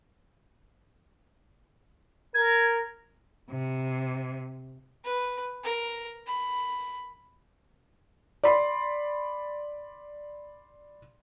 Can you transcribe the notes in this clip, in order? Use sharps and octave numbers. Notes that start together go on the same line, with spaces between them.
A#4 G#6
C3
B4
A#4
B5
D5 B5 C6